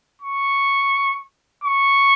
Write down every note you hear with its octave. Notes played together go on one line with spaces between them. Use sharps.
C#6
C#6